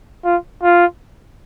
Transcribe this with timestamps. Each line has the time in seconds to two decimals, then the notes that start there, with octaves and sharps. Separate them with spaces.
0.25 F4
0.63 F4